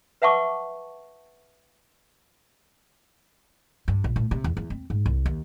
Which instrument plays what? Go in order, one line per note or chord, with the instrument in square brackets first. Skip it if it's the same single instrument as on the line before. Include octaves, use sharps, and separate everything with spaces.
[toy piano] B4 E5 F#5 A5 C#6 D6
[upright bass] G2
A#1
A2
C3
E2
E2
C4
G#2
C2
D#2